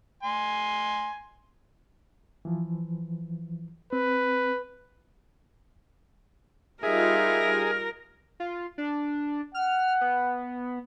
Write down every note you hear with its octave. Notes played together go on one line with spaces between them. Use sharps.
G#5 C6
E3 F3
C4 B4
G3 D#4 F4 G#4 A#4 E5
F4
D4
F#5 F6
B3